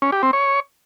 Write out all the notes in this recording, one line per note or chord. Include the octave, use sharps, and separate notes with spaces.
C#4
G4
C4
C#5